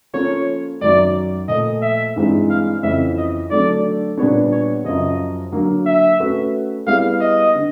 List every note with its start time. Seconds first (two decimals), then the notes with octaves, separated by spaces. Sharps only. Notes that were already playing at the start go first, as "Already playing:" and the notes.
0.14 F3 A#3 C#4 F4 A4 C#5
0.81 F#2 D#3 F#3 D5
1.48 A#2 F3 A3 D#5
1.82 E5
2.16 G2 E3 G#3 C4 D#4
2.50 F5
2.83 F2 C#3 E3 E5
3.17 D#5
3.50 D3 F#3 A3 D4 D5
4.18 A#2 G3 B3 D4 C#5
4.52 C#5
4.85 F#2 C#3 F3 D#5
5.52 D3 F#3 A#3
5.86 E5
6.20 A3 C#4 F#4 B4
6.87 G3 B3 E4 G#4 F5
7.21 D#5
7.55 D3